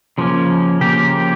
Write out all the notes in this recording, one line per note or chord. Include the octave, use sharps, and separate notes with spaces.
C#3 F3 A#3 C#4
C#3 F3 A#3 C#4 G4